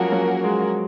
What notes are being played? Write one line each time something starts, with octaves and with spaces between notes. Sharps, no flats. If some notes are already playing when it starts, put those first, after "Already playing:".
Already playing: F3 F#3 G#3 A#3 C#4 F#4 A#4
F#3
G#3